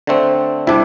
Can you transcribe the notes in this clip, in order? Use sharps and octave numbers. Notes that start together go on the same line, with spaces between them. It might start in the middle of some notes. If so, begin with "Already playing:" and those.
D3 A3 C4
C3 G3 D4 E4